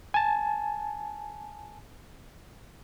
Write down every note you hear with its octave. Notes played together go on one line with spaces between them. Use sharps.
G#5 A5